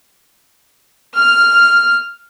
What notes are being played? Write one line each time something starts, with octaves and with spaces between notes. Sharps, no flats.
F6